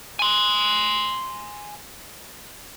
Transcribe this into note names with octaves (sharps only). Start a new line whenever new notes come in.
G#5 C6